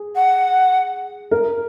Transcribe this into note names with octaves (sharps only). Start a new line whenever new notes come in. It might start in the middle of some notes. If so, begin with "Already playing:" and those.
Already playing: G#4
F#5
A#4